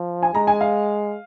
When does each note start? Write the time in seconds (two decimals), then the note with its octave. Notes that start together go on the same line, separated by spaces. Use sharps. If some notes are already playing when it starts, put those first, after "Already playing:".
Already playing: F3
0.23 G#5
0.34 G#3 A#5
0.47 G#5
0.61 F5